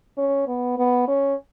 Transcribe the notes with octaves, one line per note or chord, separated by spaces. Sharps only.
C#4
B3
B3
C#4